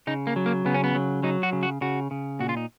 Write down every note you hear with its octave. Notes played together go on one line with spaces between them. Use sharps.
C#3 D#4
A#3
F#3
A#3
C#3 B3
C#4
B3
F#3
F#3 D#4
F#4
C#3
F#4
C#3 F#4
C#3
A#2 F#4
F4
D#4